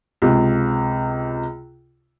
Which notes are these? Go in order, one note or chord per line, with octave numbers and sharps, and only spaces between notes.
C#2 C3